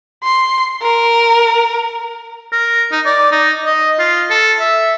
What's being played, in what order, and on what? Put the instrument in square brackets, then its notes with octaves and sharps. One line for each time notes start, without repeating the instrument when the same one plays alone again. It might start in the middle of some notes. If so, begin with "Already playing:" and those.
[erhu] C6
A#4
[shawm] A#4
D#4
D5
D#4
D#5
F4
A4
E5